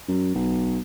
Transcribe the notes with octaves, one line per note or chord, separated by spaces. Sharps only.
F#2
B1